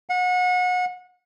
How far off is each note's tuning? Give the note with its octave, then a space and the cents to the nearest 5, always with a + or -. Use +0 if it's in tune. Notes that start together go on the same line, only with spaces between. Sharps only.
F#5 -30